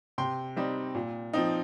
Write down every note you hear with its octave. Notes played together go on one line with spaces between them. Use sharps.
C3 G5 C6
G3 C4 D#4
A#2
F3 C4 D#4